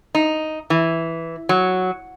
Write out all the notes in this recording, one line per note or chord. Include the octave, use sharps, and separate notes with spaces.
D#4
E3
F#3